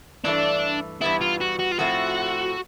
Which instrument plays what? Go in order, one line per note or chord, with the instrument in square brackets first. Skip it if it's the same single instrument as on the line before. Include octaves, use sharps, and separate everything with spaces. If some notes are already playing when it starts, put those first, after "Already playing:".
[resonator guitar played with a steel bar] G2 E3 A3 [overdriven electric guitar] D4
[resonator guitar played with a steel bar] G2 E3 G3 B3 [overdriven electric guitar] E4
[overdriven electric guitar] F4
F#4
F#4
F4
[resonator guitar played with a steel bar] A2 F3 A3 C4 [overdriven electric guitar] F#4